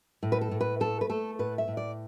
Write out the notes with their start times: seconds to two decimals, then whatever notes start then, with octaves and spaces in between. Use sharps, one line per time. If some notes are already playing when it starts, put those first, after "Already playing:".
0.23 A2
0.32 B4
0.41 A4
0.51 A2
0.61 B4
0.80 A3 A4
1.01 B4
1.10 A3 A4
1.39 A2 B4
1.58 E5
1.68 A2
1.77 D5